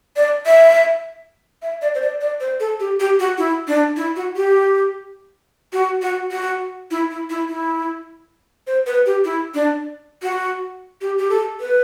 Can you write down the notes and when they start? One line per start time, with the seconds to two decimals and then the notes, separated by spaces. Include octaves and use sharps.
0.16 D5
0.46 E5
1.62 E5
1.82 D5
1.95 C5
2.02 D5
2.21 D5
2.40 C5
2.60 A4
2.80 G4
3.00 G4
3.20 F#4
3.38 E4
3.68 D4
3.97 E4
4.16 F#4
4.36 G4
5.73 F#4
6.02 F#4
6.31 F#4
6.91 E4
7.11 E4
7.30 E4
7.49 E4
8.67 C5
8.87 B4
9.06 G4
9.25 E4
9.54 D4
10.22 F#4
11.01 G4
11.19 G4
11.30 A4
11.60 B4